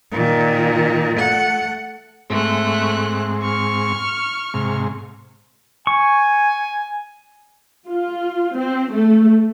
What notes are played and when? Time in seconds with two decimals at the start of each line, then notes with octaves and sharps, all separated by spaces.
0.12 A#2 D#3
1.16 A3 F#5
2.30 G#2 A3 C4 F#6
3.42 C#6 F6
4.54 G#2 C3
5.87 G#5 C#6
7.89 F4
8.56 C4
8.92 A3